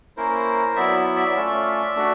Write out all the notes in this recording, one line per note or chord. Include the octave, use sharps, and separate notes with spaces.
A#3 C#4 E4 A#4 C5
F#3 B3 E4 D5 E5
D5 E5
A3 C#4 F4
A3 D4 F#4